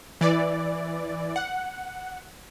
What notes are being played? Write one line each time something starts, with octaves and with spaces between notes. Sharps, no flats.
E3 D5
F#5